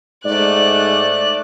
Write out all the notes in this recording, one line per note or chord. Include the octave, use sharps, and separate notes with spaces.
G#2 A3 D5 F#6